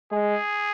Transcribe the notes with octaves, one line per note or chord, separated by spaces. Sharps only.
G#3 G#4